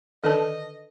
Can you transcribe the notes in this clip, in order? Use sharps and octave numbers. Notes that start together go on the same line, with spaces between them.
D3 D#3 D4 A4 B4 D#5 A5